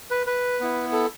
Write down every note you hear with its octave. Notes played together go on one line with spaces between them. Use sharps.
B4
B4
B3 E4
A4